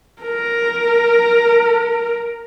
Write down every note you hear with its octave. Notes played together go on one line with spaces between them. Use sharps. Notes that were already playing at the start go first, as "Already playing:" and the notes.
A#4